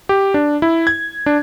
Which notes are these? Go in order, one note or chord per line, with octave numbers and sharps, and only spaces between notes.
G4
D4
E4
G#6
D4